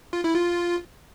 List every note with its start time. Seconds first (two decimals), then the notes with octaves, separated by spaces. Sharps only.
0.13 F4
0.24 E4
0.35 F4